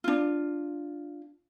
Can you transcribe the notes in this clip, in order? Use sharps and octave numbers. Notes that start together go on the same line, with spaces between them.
D4 F4